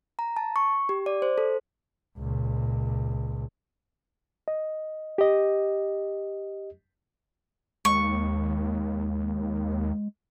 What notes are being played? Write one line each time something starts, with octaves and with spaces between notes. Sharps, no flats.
A#5
A5
C#6
G4
D5
C5
A4
C#2 A#2
D#5
G4 D#5
D#2 G#3 C#6